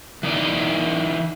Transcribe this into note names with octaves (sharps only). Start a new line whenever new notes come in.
E3 D#4 D5